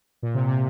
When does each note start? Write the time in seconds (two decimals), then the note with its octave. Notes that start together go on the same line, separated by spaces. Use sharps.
0.23 A#2
0.34 C3
0.48 C3